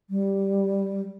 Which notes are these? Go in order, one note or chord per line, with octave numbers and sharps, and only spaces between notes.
G3